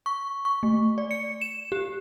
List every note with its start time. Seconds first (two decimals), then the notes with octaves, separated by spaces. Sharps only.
0.06 C#6
0.45 C#6
0.63 A3
0.98 D5
1.11 C#7
1.41 E7
1.72 G4